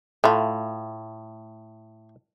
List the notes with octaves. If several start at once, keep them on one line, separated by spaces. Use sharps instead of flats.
A2 A3 F4